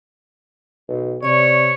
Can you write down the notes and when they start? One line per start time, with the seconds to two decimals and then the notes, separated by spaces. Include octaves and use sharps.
0.88 B1
1.23 C3 C#5 D5 C#6